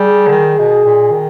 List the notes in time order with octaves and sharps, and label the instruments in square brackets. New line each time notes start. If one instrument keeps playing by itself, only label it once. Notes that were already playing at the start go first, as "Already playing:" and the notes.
Already playing: [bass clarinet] G3 [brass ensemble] G#4
[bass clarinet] D3
D#3
B2
A#2
D#3